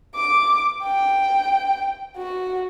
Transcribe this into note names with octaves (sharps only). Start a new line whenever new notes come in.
D6
G5
F#4